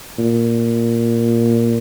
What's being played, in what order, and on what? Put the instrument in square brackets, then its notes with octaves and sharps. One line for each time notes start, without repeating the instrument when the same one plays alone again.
[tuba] A#2